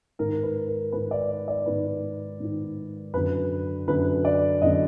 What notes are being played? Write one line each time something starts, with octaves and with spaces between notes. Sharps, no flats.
G#2 D#3 A#4
B4
A#4
G#2 D#3 B4
D5
D5
D5
G#2 D#3 B4
G#2 D#3
F#2 D3 B4
F#2 D3 B4
D5
F#2 D3 D#5